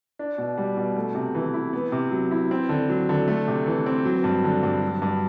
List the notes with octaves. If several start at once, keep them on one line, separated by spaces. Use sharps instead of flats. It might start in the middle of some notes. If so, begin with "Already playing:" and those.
D4
B2
G3
B2
A3
C3
E3
E4
B3
C3
F#3
E4
C4
D3
F#3
D3
A3
C3
E3
C4
F#3
G2
D3
G2
F#3
G2